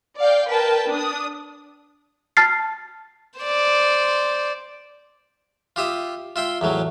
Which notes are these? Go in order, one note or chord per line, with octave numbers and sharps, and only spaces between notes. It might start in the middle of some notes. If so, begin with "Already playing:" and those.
D5 F5 G5
A#4 B4 G5 A5
D4 D#6
A5 F6 A6 C7
C5 D5
F4 G4 E5 D#6
F4 E5 G5 C6
E2 A2 F#3